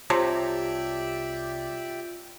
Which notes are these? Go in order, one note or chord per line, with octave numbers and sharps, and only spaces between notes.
C2 C3 F4 G4 C#5 D5 E5 A5